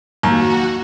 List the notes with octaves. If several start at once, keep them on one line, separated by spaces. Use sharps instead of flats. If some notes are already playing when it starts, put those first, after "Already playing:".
D#2 F#4